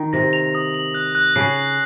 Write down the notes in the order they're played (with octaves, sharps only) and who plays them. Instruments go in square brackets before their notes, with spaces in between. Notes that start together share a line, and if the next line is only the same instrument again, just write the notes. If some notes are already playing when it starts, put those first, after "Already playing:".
Already playing: [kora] D#3
[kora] C3 [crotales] A#6
[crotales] F7
D#6
F#7
F#6
F#6
[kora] C#3 [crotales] C7
[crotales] F#7